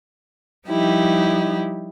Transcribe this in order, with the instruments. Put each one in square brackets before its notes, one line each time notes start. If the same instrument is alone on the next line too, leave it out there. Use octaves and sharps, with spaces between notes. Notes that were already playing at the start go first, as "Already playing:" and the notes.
[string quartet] F3 G3 D#4 E4 G4